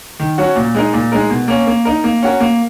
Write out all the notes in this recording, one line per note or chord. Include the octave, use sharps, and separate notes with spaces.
D#3
F#3 C#4 F#4
A#2
G#3 D#4 A#4
A#2
G#3 D#4 A#4
B2
A#3 C#4
A#3
D#4 A#4
A#3
C#4 F#4 A#4
A#3